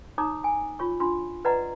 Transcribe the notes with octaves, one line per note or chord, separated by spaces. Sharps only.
D#4 C#5 A#5 D6 D#6
G#5
F4 C#5 C#6
D4 F4 C6
B4 D5 D#5 F#5 A#5